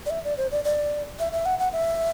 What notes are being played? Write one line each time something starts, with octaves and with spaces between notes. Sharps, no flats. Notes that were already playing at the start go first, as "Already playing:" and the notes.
D5
E5
D5
C5
D5
D5
E5
E5
F#5
F#5
E5